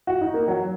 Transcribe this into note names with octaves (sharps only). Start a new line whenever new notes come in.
F#4
D#4
A#3
F#3